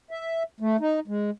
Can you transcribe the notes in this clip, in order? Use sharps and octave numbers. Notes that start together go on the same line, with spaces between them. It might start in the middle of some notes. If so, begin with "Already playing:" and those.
E5
A3
D#4
G#3